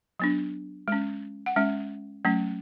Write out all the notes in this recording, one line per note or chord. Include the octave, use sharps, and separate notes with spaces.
F#3 B3 D4
G#3 C#4
F#5
G#3 C#4 E5
F#3 A3 C#4